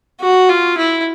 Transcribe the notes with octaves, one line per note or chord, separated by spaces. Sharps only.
F#4
F4
E4